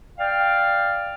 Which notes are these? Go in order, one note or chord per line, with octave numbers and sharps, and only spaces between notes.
D5 F5 G5